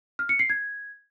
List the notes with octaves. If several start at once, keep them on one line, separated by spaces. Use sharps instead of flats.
F6
C#7
C7
G#6